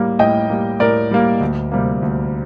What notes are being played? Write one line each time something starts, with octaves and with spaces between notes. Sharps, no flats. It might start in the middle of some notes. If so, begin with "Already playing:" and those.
Already playing: A2 G3 A#3
A2 D#5 G5
G3 A#3
A2 A#4 D5
G3 A#3
D2
C3 G3 A#3
D2